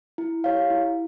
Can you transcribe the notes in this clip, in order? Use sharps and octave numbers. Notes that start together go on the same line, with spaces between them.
E4
G4 C#5 F5
E4